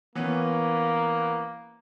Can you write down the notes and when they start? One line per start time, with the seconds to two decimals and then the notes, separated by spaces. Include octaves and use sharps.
0.15 E3 A#3 B3 C#4